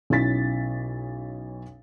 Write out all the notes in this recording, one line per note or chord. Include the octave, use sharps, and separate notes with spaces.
B1 C#4 E4 A6 B6